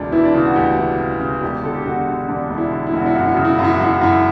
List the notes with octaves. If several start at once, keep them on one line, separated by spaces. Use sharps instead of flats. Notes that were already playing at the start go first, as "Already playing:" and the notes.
Already playing: E1 D2 D4
E3 E4
D4
C#3 E4
F#4
D2 G4
E3
C#3
C#3
E1 G4
D3 A4
G4
E1 F#4
D3
E1 D4
E1
E4
D3
E4
E1 F#4
E4
F#2 F#4
E4
C#3 F#4
E4
F#2 F#4
E4
F#4
F#2 E4
F#4
F#2 E4